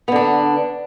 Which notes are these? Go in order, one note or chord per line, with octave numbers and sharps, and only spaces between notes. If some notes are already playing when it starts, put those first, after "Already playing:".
D3 B3 D4